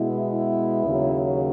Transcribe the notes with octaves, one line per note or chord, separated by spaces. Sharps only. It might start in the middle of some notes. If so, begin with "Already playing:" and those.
Already playing: B2 G#3 B3 E4
E4
D#2 C#3 F#3